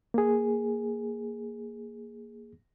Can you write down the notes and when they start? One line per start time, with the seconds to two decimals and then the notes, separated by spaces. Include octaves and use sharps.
0.14 A#3 G#4